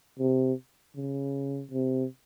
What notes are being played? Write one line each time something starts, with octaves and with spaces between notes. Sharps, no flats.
C3
C#3
C3